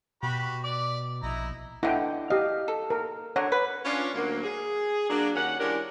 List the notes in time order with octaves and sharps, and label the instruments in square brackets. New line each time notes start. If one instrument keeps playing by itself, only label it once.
[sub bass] B2 [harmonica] F#4 G4 B5
[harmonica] D5 D6
[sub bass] A#1 [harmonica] D#4 E4 A#5
[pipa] B2 D3 [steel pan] E4 G5
[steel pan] G4 D#5 [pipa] F5
[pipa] A4
[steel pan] A#4
[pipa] D3 F#3 [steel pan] C#5
[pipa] B4
[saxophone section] C#4 D4 F4
D2 F#3 A#3
G#4
F#3 A#3 D4
D#2 D#3 C#4 F#5
E3 G#3 C#4 D4 G4 A#4